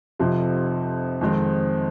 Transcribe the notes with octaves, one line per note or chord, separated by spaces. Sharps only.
F1 F2 C3 F3
F2 D#3 G#3 C4